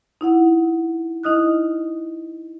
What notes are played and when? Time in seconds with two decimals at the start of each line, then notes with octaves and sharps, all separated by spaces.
0.21 D#4 E4 F#5
1.23 D#4 E4 D#5 D#6 F6 F#6